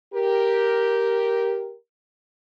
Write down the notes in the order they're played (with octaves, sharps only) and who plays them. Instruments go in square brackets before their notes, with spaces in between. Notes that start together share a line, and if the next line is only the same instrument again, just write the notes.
[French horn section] G4 A#4